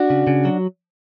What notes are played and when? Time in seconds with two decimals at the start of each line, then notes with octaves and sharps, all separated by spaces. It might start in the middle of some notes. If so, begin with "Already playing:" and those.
Already playing: D4 F#4
0.10 C#3
0.27 C#3
0.45 F#3